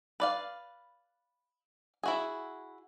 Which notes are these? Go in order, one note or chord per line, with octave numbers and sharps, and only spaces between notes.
B4 D5 F5
E4 F#4 G#4